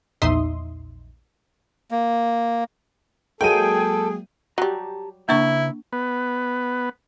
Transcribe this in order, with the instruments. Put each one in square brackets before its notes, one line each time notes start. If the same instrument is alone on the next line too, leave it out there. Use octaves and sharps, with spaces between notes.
[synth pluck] A#1 E2 D#4 E5 C6 D#6
[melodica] A#3
[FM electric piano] F#3 G#3 A#3 [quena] G#4 [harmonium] A4 [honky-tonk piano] G5 D#7
[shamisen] F#3 G3 [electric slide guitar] G4 A5 A#5
[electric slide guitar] C#3 B4 A#5 [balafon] A#3 D4 C#6 [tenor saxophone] E4
[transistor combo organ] B3